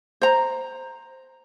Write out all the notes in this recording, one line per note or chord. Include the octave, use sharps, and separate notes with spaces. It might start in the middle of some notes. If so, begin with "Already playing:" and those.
C5 A#5